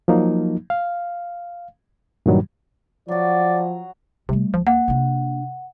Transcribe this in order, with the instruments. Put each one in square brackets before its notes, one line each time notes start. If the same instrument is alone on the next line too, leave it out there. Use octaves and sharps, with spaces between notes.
[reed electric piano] F3 F#3 A#3 D#4
F5
G2 A#2 D#3 F#3 G3
[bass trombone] F3 [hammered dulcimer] F#3 F#4 [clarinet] D5
[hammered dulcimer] A#5
[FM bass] C3 [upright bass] G3 A3
[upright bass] C#2 [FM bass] F3
[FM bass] A#3 [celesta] F#5
[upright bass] C3 D4